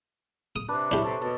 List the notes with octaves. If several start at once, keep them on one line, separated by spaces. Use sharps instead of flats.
D#6
C3 D4 B4
D4 E4 G4 C#5 B5
C3 A4
B2 A4